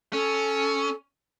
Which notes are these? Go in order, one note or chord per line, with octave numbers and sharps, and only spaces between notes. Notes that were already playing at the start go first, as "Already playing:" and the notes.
C#4 A4